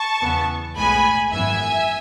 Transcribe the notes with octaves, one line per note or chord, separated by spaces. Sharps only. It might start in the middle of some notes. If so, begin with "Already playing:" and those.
Already playing: A5 C#6
E2 C#3 E3 B3
B1 A2 G#3 B3 G#5 B5
G#1 F#2 E3 B3 E5 G#5